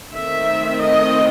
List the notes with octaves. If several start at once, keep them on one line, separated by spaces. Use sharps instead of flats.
D#3 A3 C4 E5
D#5